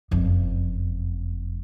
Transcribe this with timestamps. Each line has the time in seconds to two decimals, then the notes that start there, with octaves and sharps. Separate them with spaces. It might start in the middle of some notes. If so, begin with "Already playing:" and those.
0.11 F#1 F2